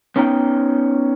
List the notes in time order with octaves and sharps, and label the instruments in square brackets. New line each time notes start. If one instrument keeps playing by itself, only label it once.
[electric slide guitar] B3 C#4 D#4 G5 A#5